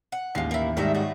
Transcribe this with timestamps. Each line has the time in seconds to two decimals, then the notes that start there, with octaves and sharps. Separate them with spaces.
0.12 F#5
0.35 A1 D#2 G#3 F4 C7
0.51 A#3 E4
0.77 G#2 D#3 G3 A3 A#4 E5
0.94 A2 A3 F#4